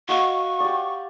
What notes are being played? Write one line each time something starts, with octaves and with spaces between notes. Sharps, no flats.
F#4 D#5 F5 C#6
G4 D5